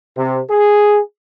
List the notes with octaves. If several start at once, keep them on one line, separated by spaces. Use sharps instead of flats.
C3
G#4